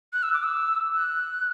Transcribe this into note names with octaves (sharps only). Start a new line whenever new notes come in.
F#6
E6
D6
E6
F#6